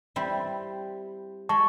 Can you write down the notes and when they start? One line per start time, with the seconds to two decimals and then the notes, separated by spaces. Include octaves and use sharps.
0.16 G3 C4 E4
1.49 G#3 A5 C#6